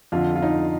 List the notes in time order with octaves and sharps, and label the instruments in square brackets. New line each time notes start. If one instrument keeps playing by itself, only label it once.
[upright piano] F2 D3 F4
F4
D#4